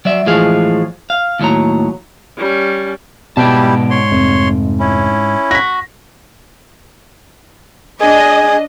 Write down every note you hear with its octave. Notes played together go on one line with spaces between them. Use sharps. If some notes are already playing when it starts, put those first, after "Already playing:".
F#3 D5 E5
A2 E3 F3 G#3 G#4 F5
F5
D#2 A2 F#3 A#5
G3 C#4
G#2 B2 G3 E4 G4 D5 A5
C#5 C6
F1
C#4 E4
F#4 A#6 B6
D4 G#4 D#5